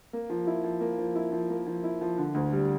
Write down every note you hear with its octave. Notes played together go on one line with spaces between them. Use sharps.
A#3
F3
E4
F3
A#3
F3
E4
F3
A#3
F3
E4
F3
D3
D2
G3